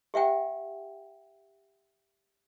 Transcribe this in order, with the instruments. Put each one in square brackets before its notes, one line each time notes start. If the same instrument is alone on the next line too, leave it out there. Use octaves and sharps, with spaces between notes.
[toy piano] G4 E5 F#5 G5